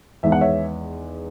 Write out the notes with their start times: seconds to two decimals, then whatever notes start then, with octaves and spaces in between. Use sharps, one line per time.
0.23 E2 D#3 G#3 E5
0.32 F#5
0.41 C#5 E5